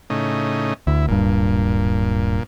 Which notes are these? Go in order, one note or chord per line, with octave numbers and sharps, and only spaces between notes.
A2 C#3 D#4
D2 E4
D1 G2 A#2